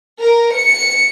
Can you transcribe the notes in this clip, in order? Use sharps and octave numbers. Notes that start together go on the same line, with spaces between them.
A#4
C#7